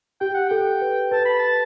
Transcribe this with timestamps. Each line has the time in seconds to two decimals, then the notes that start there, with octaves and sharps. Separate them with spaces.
0.21 G4 G5
0.34 F#5
0.49 A4 G5
0.81 B4
1.12 B4 A5
1.25 B5
1.39 A5